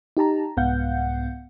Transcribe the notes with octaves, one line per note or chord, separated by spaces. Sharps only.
D#4 G4 A5 A#5
C2 G#2 B3 F5 F#5 G6